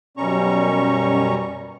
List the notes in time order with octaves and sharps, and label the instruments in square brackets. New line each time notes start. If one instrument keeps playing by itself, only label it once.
[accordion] F#2 B2 G3 C#4 A#5 C#6